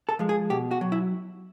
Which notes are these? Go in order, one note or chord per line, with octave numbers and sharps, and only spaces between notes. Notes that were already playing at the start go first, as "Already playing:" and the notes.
A4
F3 G#3
G#4
B2 G4
F#4
F#3
E4